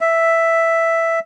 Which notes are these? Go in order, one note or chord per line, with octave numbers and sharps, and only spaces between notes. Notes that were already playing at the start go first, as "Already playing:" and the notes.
E5